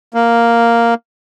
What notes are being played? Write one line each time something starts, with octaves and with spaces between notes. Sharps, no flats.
A#3